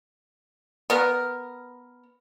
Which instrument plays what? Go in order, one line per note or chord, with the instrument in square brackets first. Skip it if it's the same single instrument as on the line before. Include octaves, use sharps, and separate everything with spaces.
[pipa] B3 A#4